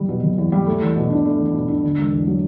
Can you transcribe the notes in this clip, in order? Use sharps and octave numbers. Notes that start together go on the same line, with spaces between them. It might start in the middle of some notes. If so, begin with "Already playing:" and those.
Already playing: F#1 E2 G3
B2
F#1
E2
G3
A3
E2
B2
D4
A3
E2
B2
D4
D3
E1
E2
F#3